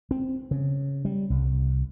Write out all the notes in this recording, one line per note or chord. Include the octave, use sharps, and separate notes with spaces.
C4
C#3
G3
C2